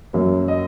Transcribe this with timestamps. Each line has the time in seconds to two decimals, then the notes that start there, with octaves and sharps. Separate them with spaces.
0.13 F#2 F#3 A#3
0.48 D#5